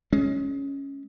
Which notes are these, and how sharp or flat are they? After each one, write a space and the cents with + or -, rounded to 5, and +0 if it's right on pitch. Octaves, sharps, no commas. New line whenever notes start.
G#3 +20 C#4 +0